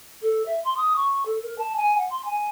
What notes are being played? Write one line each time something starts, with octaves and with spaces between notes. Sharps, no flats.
A4
E5
C6
D#6
C#6
A4
A#4
A5
G#5
F#5
C6
G#5